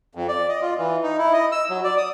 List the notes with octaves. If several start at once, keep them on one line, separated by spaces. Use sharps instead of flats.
F2
D5
D#5
F4
E3
D#4
E4
D#5
E6
F#3
D5
D#6